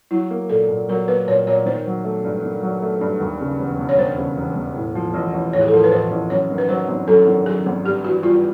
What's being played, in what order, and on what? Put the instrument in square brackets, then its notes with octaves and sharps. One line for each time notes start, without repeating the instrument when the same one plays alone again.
[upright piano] F#3 [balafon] E4
[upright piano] A#3
[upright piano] A#2 [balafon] A4
[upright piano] A#2
[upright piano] F#3 [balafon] A#4
[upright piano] A#3 [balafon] B4
[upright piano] A#2 [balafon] C#5
[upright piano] A#2 [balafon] C#5
[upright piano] D#3 [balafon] C5
[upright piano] F#3
A3
G2
D#3
F#3
A3
G2
D#2
C#3
E1
E1
[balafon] C#5
[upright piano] D#2 [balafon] C5
[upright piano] C#3
E1
E1
A2
F3
A1
A1
[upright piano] A2 [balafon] C#5
[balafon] G#4
A4
[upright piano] F3 [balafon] A#4
[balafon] B4
[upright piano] A1 [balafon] C5
[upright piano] A1
[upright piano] F#2 [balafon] C#5
[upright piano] D#3
[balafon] B4
[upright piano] F#3 [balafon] C5
[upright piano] G#1
[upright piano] F#2 [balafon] A4
[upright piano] D#3
[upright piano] F#3 [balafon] G#4
[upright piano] G#1
[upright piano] G2 [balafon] G4
[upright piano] E3 [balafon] F#4
[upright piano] G3 [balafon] F4